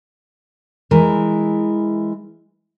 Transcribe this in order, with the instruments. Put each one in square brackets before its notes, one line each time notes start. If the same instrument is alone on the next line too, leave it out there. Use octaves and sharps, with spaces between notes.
[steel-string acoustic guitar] E3 G#3 E4 A#4